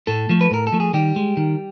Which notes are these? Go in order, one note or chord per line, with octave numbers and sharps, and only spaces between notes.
A2 A3 A4
F3 A3
B4
A2 A#4
A4
F3 A3
G#4
D#3 G3 G4
G#3
D#3